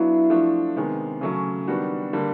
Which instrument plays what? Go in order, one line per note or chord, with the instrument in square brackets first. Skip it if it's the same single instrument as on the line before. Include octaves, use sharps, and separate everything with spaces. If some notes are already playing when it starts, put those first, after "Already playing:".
Already playing: [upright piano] F#3 B3 D4 F4 [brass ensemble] E4
[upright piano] F3 A3 D4 F#4
C3 D#3 G#3 B3
C#3 F#3 A3 C#4
D#3 G3 B3 D4 F#4
D3 G3 A#3